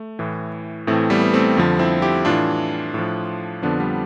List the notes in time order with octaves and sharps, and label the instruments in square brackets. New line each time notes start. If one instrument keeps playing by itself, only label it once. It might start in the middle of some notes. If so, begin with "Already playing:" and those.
Already playing: [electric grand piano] A3
A2 E3
A2 E3 A3 C4
G3 B3
B3
A3 C4
F2 D3 F3
C4 E4
E4 G4
A2 E3 D4 F4
A2 F3
F2 D3 F3 B3 D4
G3 B3